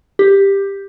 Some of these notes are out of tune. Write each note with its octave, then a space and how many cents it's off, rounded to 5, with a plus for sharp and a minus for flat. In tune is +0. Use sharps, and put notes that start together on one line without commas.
G4 +10